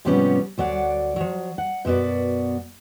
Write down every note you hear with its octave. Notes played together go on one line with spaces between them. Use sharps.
G#2 C3 F3 G3 B3 C#4
D2 F#3 D5 F#5
F3 F#3
F#5
F#2 B2 B3 F#4 D5